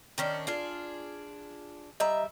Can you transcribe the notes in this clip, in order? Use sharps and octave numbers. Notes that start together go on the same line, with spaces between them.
D#3 C#4 D4
D4 F4 G#4
G3 D#5 E5 A#5